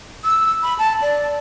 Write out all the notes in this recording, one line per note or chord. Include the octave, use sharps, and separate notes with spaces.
E6
B5
A5
D5